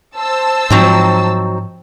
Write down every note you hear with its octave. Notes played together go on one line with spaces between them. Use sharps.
C5 A5 E6
G#2 F3 F#3 C4 D#4